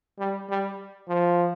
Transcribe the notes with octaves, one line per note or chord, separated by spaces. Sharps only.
G3
G3
F3